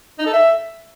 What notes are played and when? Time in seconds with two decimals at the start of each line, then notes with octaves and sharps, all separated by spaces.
0.19 D#4
0.26 A4
0.33 E5